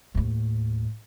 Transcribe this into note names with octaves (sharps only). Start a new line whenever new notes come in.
D#2 A2